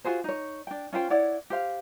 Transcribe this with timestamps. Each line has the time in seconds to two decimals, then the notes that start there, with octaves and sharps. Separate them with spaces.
0.05 F4 F#4 G#4 C5
0.24 D#4 C#5
0.67 D4 G5
0.93 C#4 F4 C5 G5
1.10 E4 C#5 D5 F#5
1.50 G4 C5 F5